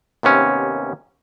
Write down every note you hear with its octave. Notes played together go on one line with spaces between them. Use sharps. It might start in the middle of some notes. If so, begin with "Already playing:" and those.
D#2 C3 B3 C#4